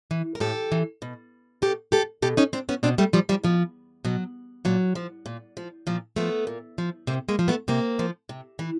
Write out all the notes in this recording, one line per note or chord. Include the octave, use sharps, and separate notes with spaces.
E3
A#4
A2 G4 A4
E3
B2
B2 G4 A4
G4 A4
B2 G4 A4
C#4 D#4
C4 D4
B3 C#4
B2 C4 D4
G3 A3
F3 G3
F3 G3
B2 F3
B2 F#3
A#2 F#3
F3
A#2
F3
A#2 F3
F3 A3 B3
A#2
F3
C3 A#3 C4
G#3 A#3
F3
A3 B3
C3 A#3 C4
F3
C3
E3